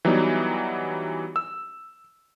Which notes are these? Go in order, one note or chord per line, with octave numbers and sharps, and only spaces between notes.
E3 F#3 G3 B3 D#4
E6